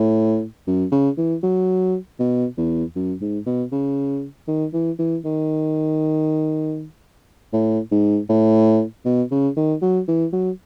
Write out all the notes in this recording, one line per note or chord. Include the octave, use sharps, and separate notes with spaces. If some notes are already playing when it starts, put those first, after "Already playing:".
Already playing: A2
F#2
C#3
E3
F#3
B2
E2
F#2
G#2
B2
C#3
D#3
E3
E3
D#3
A2
G#2
A2
B2
C#3
D#3
F#3
E3
F#3